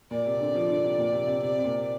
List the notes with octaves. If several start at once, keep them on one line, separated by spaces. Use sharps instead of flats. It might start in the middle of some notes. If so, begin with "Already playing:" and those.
A#2 D5
C3
D3
F3
D3
C3
A#2
C3
C3
C3 D5
C3
A#2